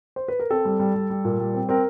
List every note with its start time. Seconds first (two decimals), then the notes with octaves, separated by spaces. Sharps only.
0.16 C5
0.28 B4
0.40 A#4
0.50 C4 A4
0.65 G3
0.80 G3
0.95 G3
1.10 G3
1.25 A#2
1.40 G3
1.54 C4
1.69 C4 A#4